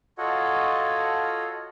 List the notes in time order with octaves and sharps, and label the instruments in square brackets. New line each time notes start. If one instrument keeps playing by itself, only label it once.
[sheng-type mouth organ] F4 F#4 A4 C#5 D#5 F#5